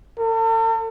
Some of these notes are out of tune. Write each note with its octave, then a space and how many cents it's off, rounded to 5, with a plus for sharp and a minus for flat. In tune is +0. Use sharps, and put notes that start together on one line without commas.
A4 +45